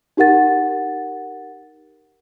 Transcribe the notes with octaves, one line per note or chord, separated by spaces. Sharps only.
D#4 G4 A#4 F#5 A6